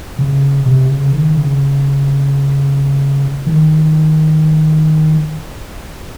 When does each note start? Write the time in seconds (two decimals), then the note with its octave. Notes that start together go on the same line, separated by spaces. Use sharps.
0.19 C#3
0.66 C3
0.89 C#3
1.12 D#3
1.36 C#3
3.46 D#3